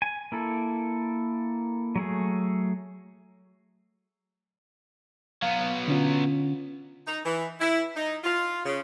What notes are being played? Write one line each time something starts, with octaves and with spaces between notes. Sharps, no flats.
G#5
A#3 E4 A4
F#3 A3 G#4
F#3 B3 F5
D3 C#4 F4
D#4
E3
E4
D#4
F4
C#3